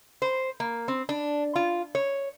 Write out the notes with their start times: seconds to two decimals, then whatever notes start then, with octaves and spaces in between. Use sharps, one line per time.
0.22 C5
0.60 A#3
0.88 C4
1.09 D4
1.56 F4
1.95 C#5